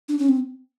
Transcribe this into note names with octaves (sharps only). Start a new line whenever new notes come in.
D4
C#4
C4